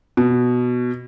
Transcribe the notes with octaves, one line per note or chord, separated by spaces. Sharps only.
B2